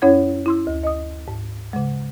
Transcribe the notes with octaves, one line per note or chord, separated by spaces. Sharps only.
F#2 C#4 E4 C#5 F#5 G#6
E4 C6 E6
D2
D#5 D#6
G#2
C#3 G#3